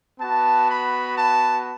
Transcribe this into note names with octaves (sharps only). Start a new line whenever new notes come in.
B3 F#4 A5
B5
A5